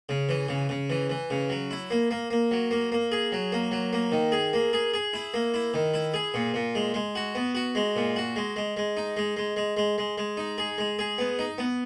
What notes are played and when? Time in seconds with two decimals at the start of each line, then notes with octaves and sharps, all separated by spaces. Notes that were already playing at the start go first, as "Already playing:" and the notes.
0.09 C#3
0.29 E3
0.49 C#3
0.69 C#3
0.90 E3
1.10 E3
1.30 C#3
1.50 F#3
1.71 E4
1.91 A#3
2.11 A#3
2.30 A#3
2.51 F#3
2.71 A#3
2.92 A#3
3.12 G#4
3.32 F#3
3.52 A#3
3.71 F#3
3.93 A#3
4.12 D#3
4.32 G#4
4.53 A#3
4.73 G#4
4.94 G#4
5.13 E4
5.34 A#3
5.54 E4
5.74 D#3
5.94 E4
6.14 G#4
6.34 A#2
6.54 A#2
6.75 G#3
6.94 G#3
7.15 F#4
7.35 B3
7.55 F#4
7.75 G#3
7.96 A#2
8.16 F#4
8.36 G#3
8.56 G#3
8.77 G#3
8.97 D#4
9.17 G#3
9.37 G#3
9.56 G#3
9.77 G#3
9.98 G#3
10.18 G#3
10.37 D#4
10.58 G#4
10.78 G#3
10.99 G#4
11.18 B3
11.39 D#4
11.58 B3